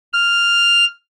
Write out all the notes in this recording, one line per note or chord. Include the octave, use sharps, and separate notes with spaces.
F6